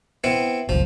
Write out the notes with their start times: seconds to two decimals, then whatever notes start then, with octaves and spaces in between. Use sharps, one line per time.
0.24 B3 C4 E4
0.69 G1 C#2 F3